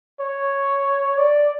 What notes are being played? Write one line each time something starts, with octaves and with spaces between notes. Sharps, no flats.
C#5
D5